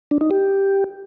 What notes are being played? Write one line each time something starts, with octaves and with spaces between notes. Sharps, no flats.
D4
D#4
G4